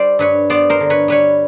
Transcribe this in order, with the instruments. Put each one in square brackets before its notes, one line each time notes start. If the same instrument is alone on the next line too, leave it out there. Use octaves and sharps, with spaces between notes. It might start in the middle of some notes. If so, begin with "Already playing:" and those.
Already playing: [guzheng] G3 C5 D5
G2 B4 C#5
B3 C5 D5
A#4 C5
D3
B4 C#5
G3 B4 C#5